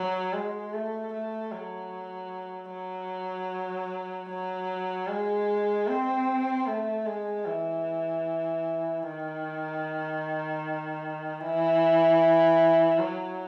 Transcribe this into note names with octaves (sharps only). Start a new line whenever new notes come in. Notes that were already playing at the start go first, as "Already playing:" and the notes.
Already playing: F#3
G#3
A3
A3
F#3
F#3
F#3
G#3
C4
A3
G#3
E3
D#3
E3
F#3